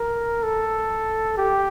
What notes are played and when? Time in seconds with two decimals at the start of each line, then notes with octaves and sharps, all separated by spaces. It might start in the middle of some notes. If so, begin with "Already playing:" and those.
Already playing: A#4
0.43 A4
1.37 G4